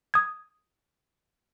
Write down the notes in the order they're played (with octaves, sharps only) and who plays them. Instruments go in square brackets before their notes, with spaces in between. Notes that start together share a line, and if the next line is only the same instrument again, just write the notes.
[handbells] D#6 G#6